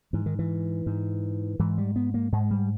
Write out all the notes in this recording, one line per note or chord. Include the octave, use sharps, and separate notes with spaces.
G#2 E3
D#3
E3
G#2
G#2 E3
G3
B3
A#3
G#2 G#3
G3